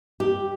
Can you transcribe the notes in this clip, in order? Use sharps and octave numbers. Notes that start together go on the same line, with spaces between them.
G4